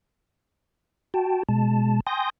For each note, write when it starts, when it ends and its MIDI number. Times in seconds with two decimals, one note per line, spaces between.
1.14 1.43 66
1.14 1.43 79
1.14 1.43 81
1.49 2.00 47
1.49 2.00 56
1.49 2.00 81
2.07 2.30 79
2.07 2.30 80
2.07 2.30 84
2.07 2.30 87
2.07 2.30 91
2.07 2.30 94